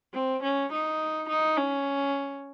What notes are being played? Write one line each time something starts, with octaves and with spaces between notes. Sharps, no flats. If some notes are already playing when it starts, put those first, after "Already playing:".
C4
C#4
D#4
D#4
C#4